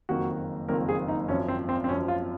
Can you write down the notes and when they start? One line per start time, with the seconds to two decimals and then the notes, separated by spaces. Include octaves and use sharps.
0.09 F#1 F2 D#3 A#3 F#4
0.68 F#1 F2 D#3 A#3 A#4
0.89 G#4
1.08 D#4
1.28 G#1 F#2 F3 C#4
1.48 C4
1.69 C4
1.84 C4
1.88 G#1 F#2 F3 C#4
2.08 F4